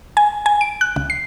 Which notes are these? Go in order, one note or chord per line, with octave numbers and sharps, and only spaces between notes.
G#5
G#5
D7
F#6
C#2
C7